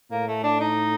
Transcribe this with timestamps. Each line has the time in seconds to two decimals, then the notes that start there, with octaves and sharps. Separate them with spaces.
0.11 A2 A#3
0.28 A3
0.44 D4
0.60 D#4